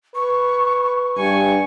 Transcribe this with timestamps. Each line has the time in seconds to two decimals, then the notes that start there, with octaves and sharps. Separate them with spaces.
0.15 B4 C#6
1.17 G2 G#5 C#6